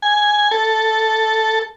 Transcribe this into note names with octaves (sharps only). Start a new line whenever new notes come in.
G#5
A4